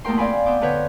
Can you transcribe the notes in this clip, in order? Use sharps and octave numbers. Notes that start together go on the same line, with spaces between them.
E2 A3 A#3 A#4 G5 C6
C4 D5 F5 G5 G#5 B5
B3 C4 G5 D6
D3 B3 B4 C#5 G6